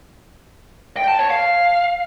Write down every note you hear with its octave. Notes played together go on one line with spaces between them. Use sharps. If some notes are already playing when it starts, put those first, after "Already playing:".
G5
A5
C#5
F5